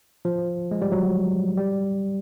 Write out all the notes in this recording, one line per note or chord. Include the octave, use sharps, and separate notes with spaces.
F3
G#3
G3
F#3
G3